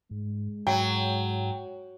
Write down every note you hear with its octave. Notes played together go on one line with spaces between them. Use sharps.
G#2 G#3
G#2 F#3 G5